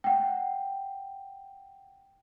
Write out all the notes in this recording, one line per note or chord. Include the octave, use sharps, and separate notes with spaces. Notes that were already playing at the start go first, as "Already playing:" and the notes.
F#5 G5